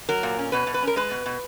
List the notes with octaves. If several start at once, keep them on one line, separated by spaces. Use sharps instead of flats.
F#3 A#4
A#2
C#4
B2 B4
B2
B4
C#4 A#4
G#3 B4
B2
B2